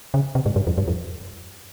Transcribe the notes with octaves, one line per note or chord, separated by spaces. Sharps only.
C#3
C3
G#2
G2
F2
G2
F2